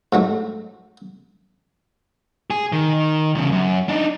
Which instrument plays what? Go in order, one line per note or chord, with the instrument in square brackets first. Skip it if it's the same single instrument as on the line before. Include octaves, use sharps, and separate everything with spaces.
[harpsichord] G#2 F#3 A3
[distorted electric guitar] G#4
D#3
E2 C#3
C2 F#2
D4 D#4